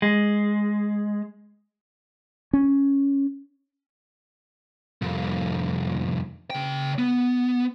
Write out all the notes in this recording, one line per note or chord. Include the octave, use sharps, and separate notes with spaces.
G#3
C#4
C2 F2
C#3 G5
B3